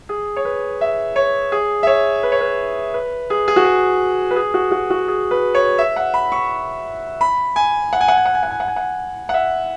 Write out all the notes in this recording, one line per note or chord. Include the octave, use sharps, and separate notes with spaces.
G#4
C#5
B4
E5
C#5
G#4
E5
C#5
B4
C#5
B4
B4
G#4
G#4
F#4
G#4
B4
G#4
F#4
F#4
F#4
G#4
B4
C#5
E5
F#5
B5
C#6
B5
G#5
F#5
G#5
F#5
G#5
F#5
G#5
F#5
G#5
F#5
G#5
F#5
F#5
E5